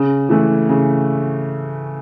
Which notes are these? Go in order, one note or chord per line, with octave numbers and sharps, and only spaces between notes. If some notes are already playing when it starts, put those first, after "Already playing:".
Already playing: C#3
E3 A3
C#3